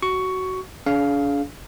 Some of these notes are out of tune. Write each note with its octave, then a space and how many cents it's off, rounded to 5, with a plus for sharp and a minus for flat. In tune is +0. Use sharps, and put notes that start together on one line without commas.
F#4 +15 C#6 +10
D4 -45 G#4 +35 F5 +0